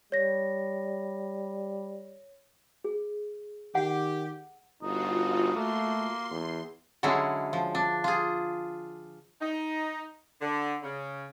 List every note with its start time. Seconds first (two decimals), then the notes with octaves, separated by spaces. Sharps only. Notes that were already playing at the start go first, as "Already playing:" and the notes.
0.12 G3 C#5 A#6
2.84 G#4
3.75 D#3 G4 F#5
4.82 G1 D#4 F4 F#4
5.56 A3 A#3 C6
6.31 E2
7.03 D3 F#3 G#3 C#4 E4
7.53 F3
7.75 D4
8.04 F4 G#4
9.41 D#4
10.42 D3
10.83 C#3